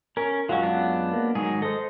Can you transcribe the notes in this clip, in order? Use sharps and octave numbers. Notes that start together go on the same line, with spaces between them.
C#4 A#4
F#2 F#3 G#3 C#4 F4
F#3 B3 D4
A#3
G#2 D#3 F#3 G#4
A4 C5 D#5 D#6